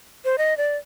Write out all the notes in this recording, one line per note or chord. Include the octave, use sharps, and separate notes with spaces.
C5
D#5
D5